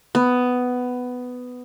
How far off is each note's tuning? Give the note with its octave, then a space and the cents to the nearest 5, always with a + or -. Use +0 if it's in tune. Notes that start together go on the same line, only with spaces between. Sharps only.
B3 +10